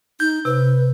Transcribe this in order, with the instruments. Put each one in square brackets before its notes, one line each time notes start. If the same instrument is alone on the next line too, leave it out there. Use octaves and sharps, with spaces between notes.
[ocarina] D#4 [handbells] G6
[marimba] C3 [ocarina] B4